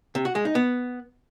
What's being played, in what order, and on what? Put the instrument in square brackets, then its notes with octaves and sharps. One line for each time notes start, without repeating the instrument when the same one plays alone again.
[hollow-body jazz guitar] C3
F#4
G#3
D#4
B3